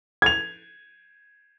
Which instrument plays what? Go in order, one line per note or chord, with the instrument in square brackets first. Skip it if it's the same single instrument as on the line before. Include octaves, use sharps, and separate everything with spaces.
[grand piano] G#6 F7